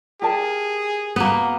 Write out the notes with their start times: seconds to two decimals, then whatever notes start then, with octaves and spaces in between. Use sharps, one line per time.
0.22 G4 G#4 A#4 A5
1.16 A#3 B3